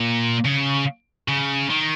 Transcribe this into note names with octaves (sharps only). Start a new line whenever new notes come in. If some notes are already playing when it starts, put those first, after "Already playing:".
Already playing: A#2
C#3
C#3
D#3